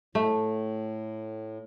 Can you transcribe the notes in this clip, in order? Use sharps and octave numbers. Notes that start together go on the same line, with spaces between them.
A2 A3